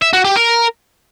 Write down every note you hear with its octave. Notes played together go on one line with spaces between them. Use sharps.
E5
F#4
G4
A#4